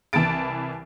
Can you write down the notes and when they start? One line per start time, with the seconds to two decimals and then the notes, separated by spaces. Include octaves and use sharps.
0.13 C2 E3 A5 B5 A6 D7